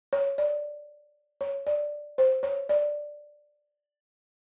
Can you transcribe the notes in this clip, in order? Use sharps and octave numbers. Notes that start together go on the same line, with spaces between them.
C#5
D5
C#5
D5
C5
C#5
D5